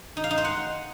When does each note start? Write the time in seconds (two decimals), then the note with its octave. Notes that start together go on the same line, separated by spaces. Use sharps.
0.17 D#4
0.24 F5
0.31 D#4
0.38 C5
0.45 F#5